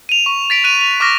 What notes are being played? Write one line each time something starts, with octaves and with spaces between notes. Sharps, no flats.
D#7 F7
C#6
A6 B6 D7
F#6 D#7 F7
F7
C#6 D6 F6 A#6